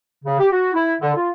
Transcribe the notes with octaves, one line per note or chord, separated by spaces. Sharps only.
C#3
G4
F#4
E4
D3
F4